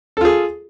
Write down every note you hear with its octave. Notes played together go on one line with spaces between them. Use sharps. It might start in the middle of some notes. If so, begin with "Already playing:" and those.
F4 G#4 A4